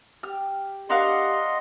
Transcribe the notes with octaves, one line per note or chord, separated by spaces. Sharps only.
G4 F6
D4 G4 A#4 D#5 F5 F#5 C6